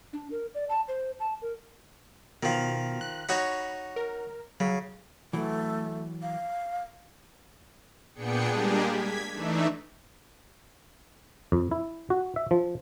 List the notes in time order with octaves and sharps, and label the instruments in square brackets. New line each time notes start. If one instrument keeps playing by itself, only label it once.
[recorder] D4
A#4
D5
A5
C5
A5
A#4
[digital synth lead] B2 [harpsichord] D#3 F3
[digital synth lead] F#6
[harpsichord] D#4 F#4 C#5 [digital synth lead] B5
[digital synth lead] A#4
[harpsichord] C#3 [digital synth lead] F#3
[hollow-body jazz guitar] E3 F#3 [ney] A3
[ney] F5
[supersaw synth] A#2 B3 D4 G#4 G5 C#7
G3 G#3 A#3 D4 G4 G#4
G#6 B6
E3 A3 D4 D#4 E5
[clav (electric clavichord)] F2
E4
F#4
E5
F3